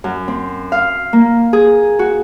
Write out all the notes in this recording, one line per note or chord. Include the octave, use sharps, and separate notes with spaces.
F#2
C4
F5
A#3
G#4
F#4